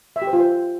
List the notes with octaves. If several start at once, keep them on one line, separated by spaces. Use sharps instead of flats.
E5
G4
C5
F4
C5